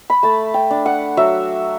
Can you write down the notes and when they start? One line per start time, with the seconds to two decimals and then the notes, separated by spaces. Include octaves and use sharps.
0.10 B5
0.23 A3 A5
0.54 G5
0.71 D4
0.86 F#5
1.17 F#3 E5